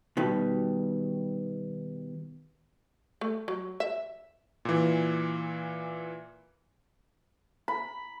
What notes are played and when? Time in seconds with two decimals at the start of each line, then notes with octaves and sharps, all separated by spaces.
0.17 B2 D#3 G3
3.21 A3
3.48 F#3
3.80 E5
4.65 A#2 E3
7.68 B5